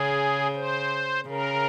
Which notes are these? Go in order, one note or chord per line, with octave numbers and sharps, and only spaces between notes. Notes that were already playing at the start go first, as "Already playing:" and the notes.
Already playing: C#3 G#4
C5
C#3 A#4